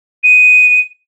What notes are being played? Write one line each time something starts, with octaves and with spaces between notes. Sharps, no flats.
D#7